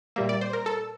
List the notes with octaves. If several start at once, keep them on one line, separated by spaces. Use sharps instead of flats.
A#2 G3 A#3 E5
D5
C5
A#4
A4